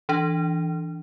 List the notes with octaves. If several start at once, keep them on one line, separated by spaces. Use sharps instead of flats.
E3 D4